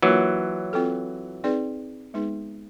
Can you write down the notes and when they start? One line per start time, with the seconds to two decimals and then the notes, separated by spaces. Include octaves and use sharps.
0.02 E3 F#3 A#3 D4 F4 A#4
0.73 C4 F4 A4
1.44 C4 D#4 G#4 B4 D5
2.14 G#3 B3 D#4 G#4 B4